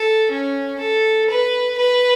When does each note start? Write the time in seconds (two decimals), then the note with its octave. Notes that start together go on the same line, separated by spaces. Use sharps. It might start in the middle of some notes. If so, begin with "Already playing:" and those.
Already playing: A4
0.30 C#4
0.79 A4
1.29 B4
1.78 B4